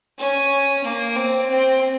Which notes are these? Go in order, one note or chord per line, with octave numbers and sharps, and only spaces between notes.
C#4
A#3
C4
C4